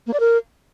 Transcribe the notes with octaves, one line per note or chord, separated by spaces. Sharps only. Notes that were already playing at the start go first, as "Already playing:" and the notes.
A#3
D5
A#4